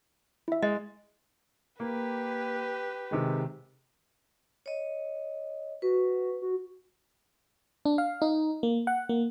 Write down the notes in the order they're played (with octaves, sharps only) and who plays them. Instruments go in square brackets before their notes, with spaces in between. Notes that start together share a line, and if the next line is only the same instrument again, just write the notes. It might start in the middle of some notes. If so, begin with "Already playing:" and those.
[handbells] E4 E5
[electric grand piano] G#3 [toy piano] D#5
[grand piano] A#3 [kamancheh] G4 B4
[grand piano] C3 D#3 G#3
[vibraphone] C#5 D#5
[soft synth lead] F#4 [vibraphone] B4
[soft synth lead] F#4
[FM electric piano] D4
F5
D#4
A#3
F#5
A#3